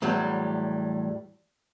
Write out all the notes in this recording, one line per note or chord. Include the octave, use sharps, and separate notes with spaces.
E2 A2 F#3 G3